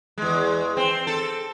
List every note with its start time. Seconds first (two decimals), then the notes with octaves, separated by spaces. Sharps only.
0.18 E2 G#3
0.77 C4
1.07 A4